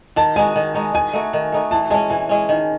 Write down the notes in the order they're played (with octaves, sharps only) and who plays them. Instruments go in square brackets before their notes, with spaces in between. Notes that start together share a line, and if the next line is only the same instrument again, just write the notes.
[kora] D#3 [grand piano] A5
[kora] G#3 D#4 F#4 [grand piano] G#5
[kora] D#3
G#3 D#4 F#4
[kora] D#3 [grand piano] G#5
[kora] A3 D#4 F#4
D#3
A3 D#4 F#4
[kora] E3 [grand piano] A5
[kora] G#3 C#4 [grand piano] A5
[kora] E3 [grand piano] G#5
[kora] G#3 C#4
D#3